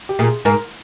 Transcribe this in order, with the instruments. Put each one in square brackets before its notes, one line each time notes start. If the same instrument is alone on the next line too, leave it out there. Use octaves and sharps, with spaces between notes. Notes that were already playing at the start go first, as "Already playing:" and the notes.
[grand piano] G4
[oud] A#2 [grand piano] G#4
[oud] G#2 [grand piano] A#4